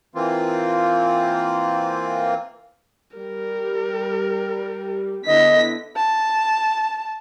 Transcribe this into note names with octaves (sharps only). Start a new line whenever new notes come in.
E3 A#3 C4 F4
G3 A#4
D3 B3 E4 D#5 B6
A5